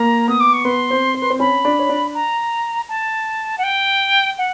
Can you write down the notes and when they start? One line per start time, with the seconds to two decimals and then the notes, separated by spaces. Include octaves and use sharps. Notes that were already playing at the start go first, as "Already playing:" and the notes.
Already playing: A#3 A#4 A#5
0.28 B3 B4 D#6
0.40 D6
0.53 C#6
0.65 B3 B4 C6
0.90 C4 C5
1.14 C5
1.22 B4
1.30 C4 C5
1.39 C#4 C#5 B5
1.65 D4 D5
1.79 C#5
1.89 D4 D5
2.14 A#5
2.89 A5
3.58 F#5
3.63 G5
4.38 F#5